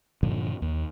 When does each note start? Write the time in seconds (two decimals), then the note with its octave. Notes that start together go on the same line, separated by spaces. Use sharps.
0.23 G2 A#2 D3 F3
0.62 D#2